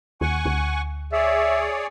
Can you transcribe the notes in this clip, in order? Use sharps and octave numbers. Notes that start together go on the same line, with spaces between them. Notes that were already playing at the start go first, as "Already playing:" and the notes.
D#2 F#5 G#5 C#6
D2
G#4 C#5 D5 E5